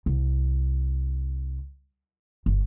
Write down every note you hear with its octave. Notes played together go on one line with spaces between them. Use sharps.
C2
G1